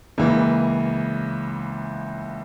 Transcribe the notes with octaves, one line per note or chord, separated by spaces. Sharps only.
C#2 C#3 E3 A#3